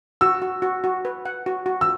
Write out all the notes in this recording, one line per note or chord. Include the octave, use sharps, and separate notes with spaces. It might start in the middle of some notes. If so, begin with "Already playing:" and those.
F#4 E6
F#4
F#4
F#4
B4
F#5
F#4
F#4
E6